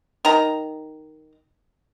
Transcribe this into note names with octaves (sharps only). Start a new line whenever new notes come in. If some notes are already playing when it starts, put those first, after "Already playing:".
D#3 A#5